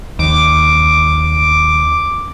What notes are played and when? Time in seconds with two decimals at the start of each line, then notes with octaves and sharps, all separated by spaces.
0.19 D#2 D6